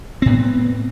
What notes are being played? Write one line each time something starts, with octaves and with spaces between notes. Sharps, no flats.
A2 B3 C4